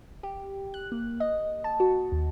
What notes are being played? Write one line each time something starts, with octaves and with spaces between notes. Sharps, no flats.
G4
F#6
A#3
D#5
A5
F#4
D#2